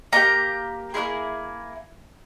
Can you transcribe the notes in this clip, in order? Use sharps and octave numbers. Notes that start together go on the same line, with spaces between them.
A#3 D#4 G4 A#5
A#3 C#4 E4 G#4